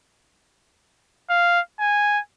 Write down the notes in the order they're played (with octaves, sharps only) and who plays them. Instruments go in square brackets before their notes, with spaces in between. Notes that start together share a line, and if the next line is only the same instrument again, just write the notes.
[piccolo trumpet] F5
G#5